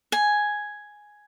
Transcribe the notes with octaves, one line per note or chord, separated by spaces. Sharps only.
G#5